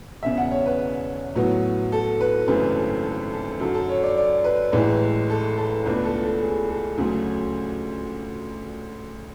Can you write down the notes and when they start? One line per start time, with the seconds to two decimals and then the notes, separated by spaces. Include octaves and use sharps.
0.23 E1 E2 C#3 E5
0.37 F#5
0.51 C#5
0.66 B4
1.35 A2 F#3 B3
1.92 A4
2.21 B4
2.48 G#1 F#2 C#3 E3 A3 B4
2.76 A4
3.04 A4
3.33 A4
3.60 F#2 D3 F#3 A4
3.74 A4
3.89 C#5
4.03 D5
4.17 D5
4.44 B4
4.72 A1 A2 E3 G#3
5.30 A4
5.57 A4
5.86 C#2 B2 A3 D4 B4
6.04 A4
6.23 A4
6.41 G#4
6.70 A4
6.98 D2 C#3 F#3 A3